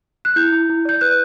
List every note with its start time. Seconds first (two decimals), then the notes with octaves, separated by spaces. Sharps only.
0.25 F#6
0.36 E4 G6
0.52 E4
0.69 E4
0.85 D5 G6
1.01 B4 F#6